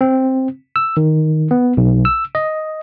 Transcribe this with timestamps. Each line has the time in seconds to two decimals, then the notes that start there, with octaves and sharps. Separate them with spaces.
0.01 C4
0.76 E6
0.97 D#3
1.51 B3
1.77 B1
2.05 E6
2.35 D#5